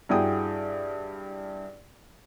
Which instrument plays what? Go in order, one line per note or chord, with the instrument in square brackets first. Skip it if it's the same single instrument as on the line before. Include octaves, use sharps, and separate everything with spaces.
[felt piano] G2 E4 F#4 G#4 G5 D#6